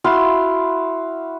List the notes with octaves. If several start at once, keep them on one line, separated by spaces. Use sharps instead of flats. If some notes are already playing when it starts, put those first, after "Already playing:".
E4 F#4 F5 C6